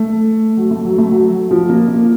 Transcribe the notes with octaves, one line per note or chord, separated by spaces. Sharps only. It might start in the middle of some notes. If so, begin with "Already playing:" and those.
Already playing: A3
F#3
A3
F#3
A3
F#3
F3
A#3
A#3